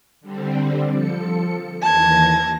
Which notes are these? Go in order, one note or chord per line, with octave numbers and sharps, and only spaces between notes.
D3 G3 C4
F3 A4 C#7
D#2 E3 A5 G#6 A#6